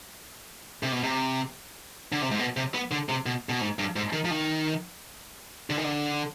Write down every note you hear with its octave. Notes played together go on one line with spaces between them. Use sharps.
C3
B2
C3
D3
C3
G#2
B2
C3
B3
D3
C3
B2
B2
G#2
G2
G#2
D#3
F3
D#3
D3
D#3
D3